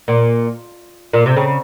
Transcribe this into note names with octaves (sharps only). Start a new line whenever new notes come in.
A#2
A#2
C3
C#3